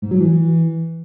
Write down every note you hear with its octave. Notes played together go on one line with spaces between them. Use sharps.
G#2
F#3
E3